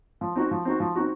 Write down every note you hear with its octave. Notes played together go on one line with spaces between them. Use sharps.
F3
C4 D#4 F#4
F3
C4 D#4 F#4
F3
C4 D#4 F#4